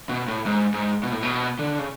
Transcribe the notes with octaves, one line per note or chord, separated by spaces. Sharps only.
B2
A2
G#2
G#2
B2
A2
B2
D3
C#3